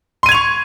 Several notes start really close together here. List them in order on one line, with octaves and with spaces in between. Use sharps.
C6 D#7 G#6 F7 C#6